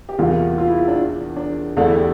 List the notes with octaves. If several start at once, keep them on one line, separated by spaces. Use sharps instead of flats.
G4
E2 C3 E3 G3 A#3 F4
F4
E4
E4
D4
D4
E2 D3 A3 D4 E4
E4
G4